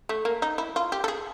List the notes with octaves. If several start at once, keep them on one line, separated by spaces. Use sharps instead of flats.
A3
A#3
D#4
E4
F4
G4
A4
G#4